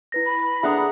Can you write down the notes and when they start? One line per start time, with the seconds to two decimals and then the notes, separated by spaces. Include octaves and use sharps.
0.12 E4 B4 A#6
0.26 B5
0.63 D3 D4 G#4 E5 F#5 A#5 D#6